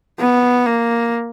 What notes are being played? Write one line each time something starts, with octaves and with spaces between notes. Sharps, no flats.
B3
A#3